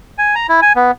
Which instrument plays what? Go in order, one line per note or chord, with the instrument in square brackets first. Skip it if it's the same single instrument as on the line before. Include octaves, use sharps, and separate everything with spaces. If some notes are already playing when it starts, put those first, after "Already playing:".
[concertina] G#5
A#5
E4
G#5
B3